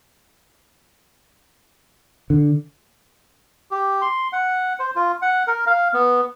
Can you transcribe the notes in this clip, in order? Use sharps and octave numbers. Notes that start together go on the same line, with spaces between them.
D3
G4
C6
F#5
C5
F4
F#5
A#4
F5
B3